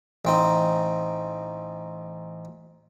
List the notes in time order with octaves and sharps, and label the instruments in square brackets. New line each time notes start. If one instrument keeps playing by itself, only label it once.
[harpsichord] A1 C4 D#4